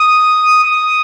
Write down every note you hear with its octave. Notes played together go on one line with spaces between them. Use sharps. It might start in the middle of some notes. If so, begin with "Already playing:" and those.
Already playing: D#6
D#6